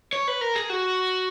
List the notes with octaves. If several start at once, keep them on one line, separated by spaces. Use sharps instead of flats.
C#5
B4
A#4
G#4
F#4